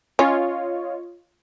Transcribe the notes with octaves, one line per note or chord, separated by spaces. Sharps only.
C#4 F4 C#5 D#5